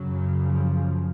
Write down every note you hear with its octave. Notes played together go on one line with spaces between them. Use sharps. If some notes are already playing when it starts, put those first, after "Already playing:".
Already playing: F#2 C#3 F#3
F3